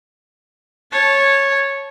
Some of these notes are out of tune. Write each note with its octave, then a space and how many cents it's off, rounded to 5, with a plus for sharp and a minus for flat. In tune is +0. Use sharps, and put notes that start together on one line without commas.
C#5 -10 A5 -15